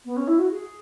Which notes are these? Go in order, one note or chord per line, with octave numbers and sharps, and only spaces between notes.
B3
C#4
E4
F#4
G#4